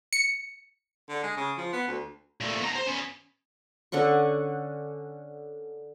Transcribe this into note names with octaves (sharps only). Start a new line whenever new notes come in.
C#7
D3
G#3
C#3
F3
B3
D2
A#2 A3
B2 A#5
C5
B3 C#4
D3 C#4 F#5 C#6